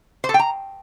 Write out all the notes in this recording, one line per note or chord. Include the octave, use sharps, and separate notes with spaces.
C5
A4
G5
A#5